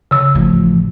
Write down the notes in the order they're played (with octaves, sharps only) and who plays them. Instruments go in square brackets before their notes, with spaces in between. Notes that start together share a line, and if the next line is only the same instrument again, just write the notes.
[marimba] C#3 E6
[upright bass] A1 F3